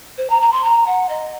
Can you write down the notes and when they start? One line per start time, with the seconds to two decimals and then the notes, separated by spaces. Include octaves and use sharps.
0.17 C5
0.29 A#5
0.41 A#5
0.51 C6
0.63 A#5
0.86 F#5
1.08 D#5